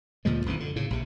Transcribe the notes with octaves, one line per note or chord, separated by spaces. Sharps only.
D2 A#2 F3 G#3
G#1 F2 D3 E3
D3
A2 C#3
A#1 C3